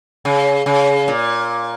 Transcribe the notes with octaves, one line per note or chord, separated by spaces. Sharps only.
C#3
C#3
A#2